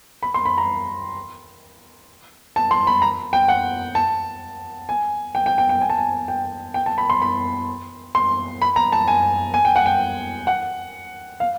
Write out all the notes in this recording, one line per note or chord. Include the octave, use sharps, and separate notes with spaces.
B5
C6
B5
A#5
A5
C6
B5
A#5
G5
F#5
A5
G#5
G5
G5
G5
G5
G#5
A5
G#5
G5
G5
A5
B5
C6
B5
C6
B5
A#5
A5
G#5
G#5
G5
F#5
G5
F#5
F5